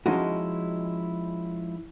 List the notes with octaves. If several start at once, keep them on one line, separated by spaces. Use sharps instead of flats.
F3 G#3 C#4 D#4 E4 F#4